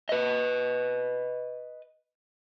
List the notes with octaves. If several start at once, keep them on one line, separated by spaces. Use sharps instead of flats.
B4 D#5